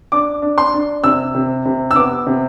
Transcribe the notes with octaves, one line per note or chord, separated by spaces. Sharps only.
D4 D6
D4
C6
D4
C3 E6
C3
C3
E6
B3 D6
C3